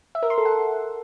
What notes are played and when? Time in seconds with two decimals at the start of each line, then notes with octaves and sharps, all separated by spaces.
0.15 E5
0.23 A#4
0.30 C6
0.38 A4
0.45 F#5